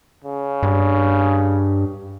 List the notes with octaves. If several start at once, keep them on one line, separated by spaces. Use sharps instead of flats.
C#3
G2